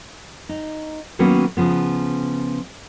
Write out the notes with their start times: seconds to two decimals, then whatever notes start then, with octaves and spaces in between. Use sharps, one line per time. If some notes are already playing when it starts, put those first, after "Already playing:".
0.49 D#4
1.19 D#3 F#3 A#3 B3 C#4
1.57 C#3 F3 B3